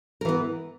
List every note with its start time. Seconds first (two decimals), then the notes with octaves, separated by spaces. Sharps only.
0.21 A#4
0.25 E3
0.29 B3